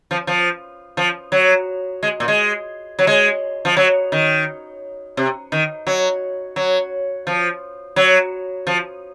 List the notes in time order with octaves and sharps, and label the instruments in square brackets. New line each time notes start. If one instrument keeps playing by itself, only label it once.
[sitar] F3
F3
F3
F#3
G#3
A#2
G#3
F#3
G#3
F3
F#3
D#3
C3
D#3
F#3
F#3
F3
F#3
F3